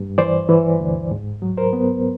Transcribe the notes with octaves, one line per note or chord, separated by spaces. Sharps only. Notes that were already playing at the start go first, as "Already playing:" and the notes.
Already playing: G2
E3 C5 D5
E3
D2
G#2
F#3
A#4 C5
B3